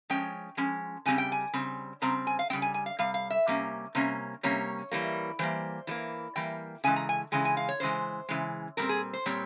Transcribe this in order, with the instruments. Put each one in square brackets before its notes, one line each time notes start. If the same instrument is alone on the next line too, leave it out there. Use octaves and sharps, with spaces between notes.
[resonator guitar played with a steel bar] F3 G#3 C#4 G5
F3 G#3 C#4
C#3 G3 C4 G#5
G5
G#5
C#3 G3 C4
C#3 G3 C4 A#5
G#5
F5
C4 G5
C#3 G3
G#5
G#5
F5
C3 G3 F5
F5
E5
C3 G3 A#3 C#4
C3 G3 A#3 C#4
C3 G3 A#3 C#4 C#5
E3 G3 A#3
E3 G3 A#3 C5
E3 G3 A#3
E3 G3 A#3 G5
C#3 E3 G#3 G#5
A#5
G#5
C#3 E3 G#3 G#5
G#5
F5
C#5
C#3 E3 G#3 C5
C#3 E3 G#3
A#2 G3 C4 A#4
G#4
C5
A#2 G3 C4 C#5